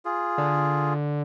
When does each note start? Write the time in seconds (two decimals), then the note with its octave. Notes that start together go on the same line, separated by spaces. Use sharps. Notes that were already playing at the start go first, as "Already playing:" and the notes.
0.05 F4 G#4
0.38 D3